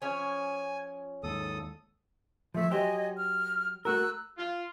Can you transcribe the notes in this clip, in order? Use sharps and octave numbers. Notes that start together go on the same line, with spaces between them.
F3 C#4 C#5 G#5
D#2 G#2 A4 D#6
F3 A3 E5
F#3 G4 C5 D#5 G#5
F6
A3 F#4 A#4 E6 F#6
F4